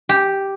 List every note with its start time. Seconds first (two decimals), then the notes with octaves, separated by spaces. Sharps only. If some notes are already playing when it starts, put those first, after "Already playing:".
0.09 G4